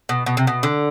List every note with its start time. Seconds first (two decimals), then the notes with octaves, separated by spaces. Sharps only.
0.09 B2
0.26 B2
0.37 C3
0.47 B2
0.63 D3